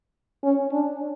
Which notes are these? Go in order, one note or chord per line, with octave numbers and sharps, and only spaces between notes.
C#4
D4